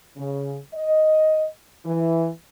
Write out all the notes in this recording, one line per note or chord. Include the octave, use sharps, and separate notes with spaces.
C#3
D#5
E3